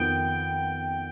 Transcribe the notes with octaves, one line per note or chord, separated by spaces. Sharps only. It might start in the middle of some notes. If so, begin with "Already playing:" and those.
Already playing: F2 D#3 B3 G5